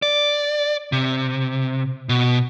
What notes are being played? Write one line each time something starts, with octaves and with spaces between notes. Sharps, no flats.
D5
C3
B2